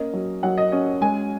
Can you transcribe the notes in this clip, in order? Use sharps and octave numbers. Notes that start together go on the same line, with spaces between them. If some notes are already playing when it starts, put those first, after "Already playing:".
Already playing: A#3 C#4 D#5
F#3
F#3 F#5
D#5
C#4 D#5
G#3 G#5